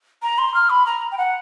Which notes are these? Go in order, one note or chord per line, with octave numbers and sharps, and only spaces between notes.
A#5
C6
F6
B5
A#5
G5
F#5